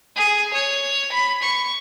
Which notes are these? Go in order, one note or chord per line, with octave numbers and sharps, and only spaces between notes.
G#4
C#5
B5
C#6